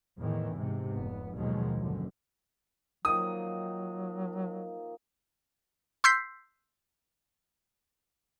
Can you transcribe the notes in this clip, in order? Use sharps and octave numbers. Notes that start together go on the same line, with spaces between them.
E2 A2 D#3 E3
G#2 C3
F1 B3
D#2 B2 D#3 F3 F#3 G#3
F#1 D3
D#3 F3 F#3 A#3 D#6
C6 E6 G6 B6 C7